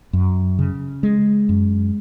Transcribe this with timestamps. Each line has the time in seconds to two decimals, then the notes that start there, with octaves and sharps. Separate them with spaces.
0.13 F#2
0.59 C#3
1.03 G#3
1.49 F#2